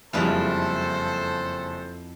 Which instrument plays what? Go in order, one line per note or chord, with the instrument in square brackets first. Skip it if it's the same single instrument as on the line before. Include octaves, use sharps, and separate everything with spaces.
[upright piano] F#1 G3 G#3 [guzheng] F2 E4 F4 [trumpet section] A4 C5